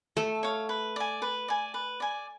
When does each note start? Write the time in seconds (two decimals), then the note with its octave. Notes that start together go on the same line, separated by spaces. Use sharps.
0.16 A3 A4
0.43 C#5 F5
0.69 B4
0.96 D5 G#5
1.22 B4
1.48 D5 G#5
1.74 B4
2.00 D5 G#5